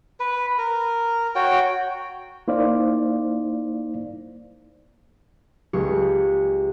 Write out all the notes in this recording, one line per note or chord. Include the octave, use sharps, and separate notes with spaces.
B4
A#4
F#4 C#5 G5
A#3 D#4 E4 C5 D5 F5
C#2 G3 G#3 G4 G#4 C#6